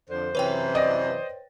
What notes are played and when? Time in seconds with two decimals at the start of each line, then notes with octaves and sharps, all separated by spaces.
0.10 F2 D3 C5
0.35 F#2 C3 E3 B4 C#5 G5
0.75 D5 D#5